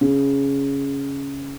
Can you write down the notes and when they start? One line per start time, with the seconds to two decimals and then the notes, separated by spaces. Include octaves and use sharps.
0.01 C#3